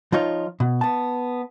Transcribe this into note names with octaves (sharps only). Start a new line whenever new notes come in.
F3 D#4 F4 C#5
B2
B3 A5